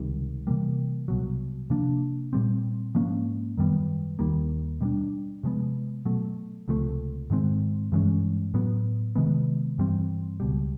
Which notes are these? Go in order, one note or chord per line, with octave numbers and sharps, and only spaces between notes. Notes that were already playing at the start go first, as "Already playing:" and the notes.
Already playing: C#2 C3 D#3 G3
C3 E3 G3 A#3
C2 B2 F#3
C3 F3 A#3 D4
A#2 G3 C4
G#2 F3 A#3 C#4
F#2 D#3 G3 B3
D#2 D#3 G3 A#3
B2 G3 A#3 D4
C3 F3 G#3 B3
B2 F#3 A3
C#2 C3 F3 A3
G#2 D#3 G#3 C4
G2 E3 G#3 C#4
A2 F#3 B3
C3 D#3 G#3 B3
G2 E3 G3 C4
C#2 B2 G3